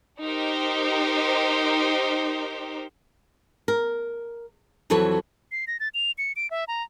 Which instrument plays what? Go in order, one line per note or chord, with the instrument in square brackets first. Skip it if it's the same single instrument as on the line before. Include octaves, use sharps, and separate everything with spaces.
[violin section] D#4 G4 A#4 C5
[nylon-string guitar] A#4
F2 E3 F#3 A4 B4 C#5
[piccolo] C7
A#6
A6
F7
C#7
D7
E5
A#5